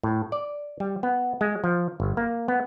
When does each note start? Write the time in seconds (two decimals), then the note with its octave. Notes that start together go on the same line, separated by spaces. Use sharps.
0.03 A2
0.32 D5
0.80 G3
1.03 B3
1.41 G#3
1.64 F3
2.00 G1
2.17 A#3
2.48 B3